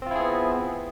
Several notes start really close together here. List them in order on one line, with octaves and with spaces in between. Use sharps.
C4 F4 E4 G#4 B3